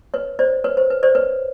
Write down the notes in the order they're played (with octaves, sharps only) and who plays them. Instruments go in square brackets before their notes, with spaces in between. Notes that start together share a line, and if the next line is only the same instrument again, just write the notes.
[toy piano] B4 C#5
C5 D5
B4 C#5
C5
B4
C5 D5
B4 C#5